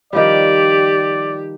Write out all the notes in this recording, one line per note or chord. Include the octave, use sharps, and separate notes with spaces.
D#3 F3 G3 G4 D5